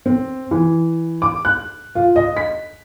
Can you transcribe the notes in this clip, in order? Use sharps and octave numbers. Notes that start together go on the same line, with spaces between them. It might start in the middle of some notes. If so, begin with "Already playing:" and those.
C4
E3
D6
F#6
F4
D#5
B6